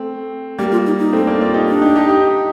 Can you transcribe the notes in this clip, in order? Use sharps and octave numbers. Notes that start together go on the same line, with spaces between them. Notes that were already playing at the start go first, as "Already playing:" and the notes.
Already playing: A3 C4
G3 A#3 G4
F4
D#4
D#4
A3 C4
A#3 D4
D4 F4
D#4 G4
D4
D#4 G4
D#4 G4
D#4 G4